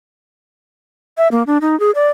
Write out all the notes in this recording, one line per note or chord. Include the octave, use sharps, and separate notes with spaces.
E5
A#3
D4
D#4
G#4
D5